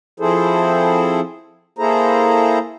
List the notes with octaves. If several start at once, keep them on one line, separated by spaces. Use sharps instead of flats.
F3 C4 E4 G#4 A4 C5
A#3 E4 G#4 A4 C5 A#5